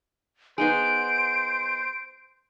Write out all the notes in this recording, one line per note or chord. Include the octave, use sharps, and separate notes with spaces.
B3 D#4 G#4 C5 D7